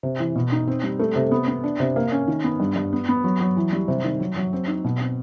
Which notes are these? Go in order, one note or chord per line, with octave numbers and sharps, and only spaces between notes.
C3
E3
B2
D#4
C4
G3
A3
C3
B3
B3
D4
C3
A#3
C#4
D#3
B3
G2
G2
B3
B3
F#3
F#3
E3
G3
C3
D#3
F#3
F#3
C4
D#4
B2
C4